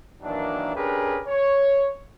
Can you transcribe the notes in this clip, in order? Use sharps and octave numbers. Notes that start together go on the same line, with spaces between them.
D#3 E3 F#3 A#3 D4
C#4 D4 G4 G#4 A#4 B4
C#5